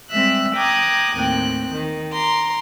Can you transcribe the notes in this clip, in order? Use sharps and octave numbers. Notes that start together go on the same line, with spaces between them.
G3 G#3 C4 E5 E6 F#6
G5 A#5 D6 D#6 F#6 G#6
D#2 A2 C4 G5 F#6
D#3
A#5 C6 D6